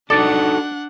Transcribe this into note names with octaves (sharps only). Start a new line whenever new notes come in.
D4 D#4 F#4 A4 D5 F#5